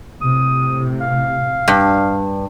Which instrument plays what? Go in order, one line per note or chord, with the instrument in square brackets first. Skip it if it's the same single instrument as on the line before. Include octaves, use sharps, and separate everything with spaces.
[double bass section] A2 C3 [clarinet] D#6
[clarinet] F5
[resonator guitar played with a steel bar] G2